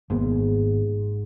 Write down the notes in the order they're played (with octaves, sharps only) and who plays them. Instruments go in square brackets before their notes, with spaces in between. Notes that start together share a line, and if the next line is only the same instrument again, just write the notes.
[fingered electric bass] G#1 A#3 B3 [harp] G#2